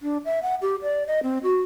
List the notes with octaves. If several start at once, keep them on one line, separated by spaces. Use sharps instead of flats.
D4
E5
F#5
G4
D5
D#5
C4
F#4